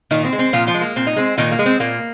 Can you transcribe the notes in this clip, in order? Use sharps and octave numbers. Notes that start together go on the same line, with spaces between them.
A#2 D#3 D#4
C4
G#3
C4
A#2 F3 F4
F3 F4
G#3
A#3
A#2 C4
D#4
G#3 C4
A#2 D#3 D#4
A#3
G#3
C4
A#2 A#3